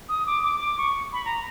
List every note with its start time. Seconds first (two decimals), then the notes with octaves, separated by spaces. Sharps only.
0.09 D#6
0.27 D6
0.43 D6
0.60 D6
0.78 C#6
1.13 B5
1.25 A#5